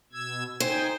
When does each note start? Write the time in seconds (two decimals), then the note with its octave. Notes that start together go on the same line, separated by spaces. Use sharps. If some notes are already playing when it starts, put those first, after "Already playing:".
0.12 B2 E6 G#6
0.60 D#4 C5 G5 G#5